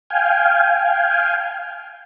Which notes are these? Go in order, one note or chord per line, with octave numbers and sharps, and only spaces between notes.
F5 G5 G#5